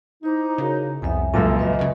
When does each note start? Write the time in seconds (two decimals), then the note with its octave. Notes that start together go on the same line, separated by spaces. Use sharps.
0.23 D#4 E4 C5 D6
0.58 C#3 F#4 A#4 C#5
1.02 C2 F2 B3 E5 G#5
1.34 C#2 F#2 A#2 D4 G#4 A4 E5 A5
1.59 B2 F4 B4 D#5 E5
1.79 F#2 C#3